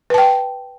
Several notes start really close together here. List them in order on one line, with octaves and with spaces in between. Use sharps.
B4 A5 G5